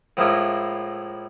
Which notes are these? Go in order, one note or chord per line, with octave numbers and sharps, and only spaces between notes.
A2 F3 G#3 A#3 E4 F4